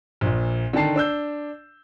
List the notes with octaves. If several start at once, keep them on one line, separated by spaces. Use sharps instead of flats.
A#1 A#2
D3 D#3 G5 A5 C7
D4 E6 G6